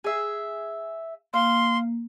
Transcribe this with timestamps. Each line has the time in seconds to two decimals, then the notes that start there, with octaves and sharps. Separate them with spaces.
0.04 G#4 E5
1.34 A#3 F5 C6